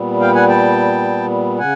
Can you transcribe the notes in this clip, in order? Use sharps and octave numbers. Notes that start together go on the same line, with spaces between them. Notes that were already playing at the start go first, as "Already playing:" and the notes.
Already playing: A#2 G3 B3
F5 G5
F#5 G#5
G5 A5
C#3 F#5 G#5